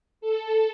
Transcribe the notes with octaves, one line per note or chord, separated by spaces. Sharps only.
A4